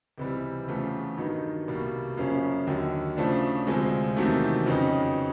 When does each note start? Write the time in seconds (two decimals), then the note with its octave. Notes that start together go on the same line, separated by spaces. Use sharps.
0.18 C#2 C3 E3 G3
0.68 E2 C#3 F3 A3
1.17 G2 D#3 F#3 B3 D#4
1.68 C2 B2 G3 A#3
2.17 F#2 C#3 F3 A#3 C#4
2.67 D#2 D3 F#3
3.17 C#3 F3 A3 D4
3.67 D2 C3 F3 G#3
4.17 E2 C3 D#3 F#3 A3
4.66 F2 C#3 F#3 B3 D#4